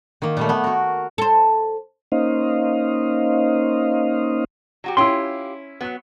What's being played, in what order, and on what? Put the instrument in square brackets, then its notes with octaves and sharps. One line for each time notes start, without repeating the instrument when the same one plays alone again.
[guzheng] D#3 A#3
A#2 G3 A3
A3 B3
F#4 A#4
[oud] A4 C5
[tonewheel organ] A#3 C#4 D#4 C5 D#5 F5
[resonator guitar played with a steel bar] F#3 F#4 G4
[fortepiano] C#4 E4 [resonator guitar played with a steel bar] F4 G4 [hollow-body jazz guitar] C6
[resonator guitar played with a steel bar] F#3 B3